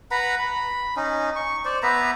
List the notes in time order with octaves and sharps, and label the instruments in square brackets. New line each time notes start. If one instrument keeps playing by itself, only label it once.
[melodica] B4 F#5 A#5 B5
B5
C#4 D#4
C#6
C5 D5
B3 B4 E5 A#5